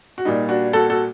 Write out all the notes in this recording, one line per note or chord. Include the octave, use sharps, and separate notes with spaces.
F#4
A#2 G3 D#4
D4 F#4
F#4 A4
F#4 A4